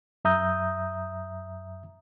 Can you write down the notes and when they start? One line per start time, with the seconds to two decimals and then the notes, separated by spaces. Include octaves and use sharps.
0.25 F#2 E5 A#5 D#6 G6